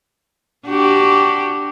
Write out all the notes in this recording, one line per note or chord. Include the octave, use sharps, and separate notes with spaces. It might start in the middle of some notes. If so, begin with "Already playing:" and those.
D4 F#4 G4